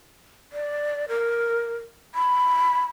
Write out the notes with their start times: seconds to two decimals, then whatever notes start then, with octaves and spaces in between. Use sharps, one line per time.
0.53 D5
1.08 A#4
2.15 B5